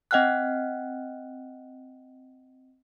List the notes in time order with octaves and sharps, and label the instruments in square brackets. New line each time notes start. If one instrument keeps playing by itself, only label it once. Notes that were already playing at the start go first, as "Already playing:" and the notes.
[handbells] C4 D#5 F#5 G5 F6 F#6